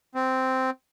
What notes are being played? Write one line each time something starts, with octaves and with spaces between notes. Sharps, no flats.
C4